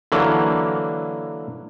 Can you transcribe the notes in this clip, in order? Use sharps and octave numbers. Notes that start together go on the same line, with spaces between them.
D3 E3 F#3 A#3